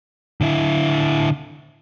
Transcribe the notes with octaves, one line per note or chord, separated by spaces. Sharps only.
D3 E4